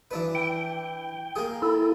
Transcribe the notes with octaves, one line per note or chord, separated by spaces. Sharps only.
E3 D4 B4
G5
A#3 G#4
E4 A4